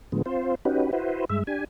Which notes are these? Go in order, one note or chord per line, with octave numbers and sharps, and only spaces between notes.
A2 D3 F3 G#3 B3
C4 F4 C5
C#4 D#4 F#4 G4 B4
E4 F#4 B4 C5
G2 G#3 E5
D4 G4 G#5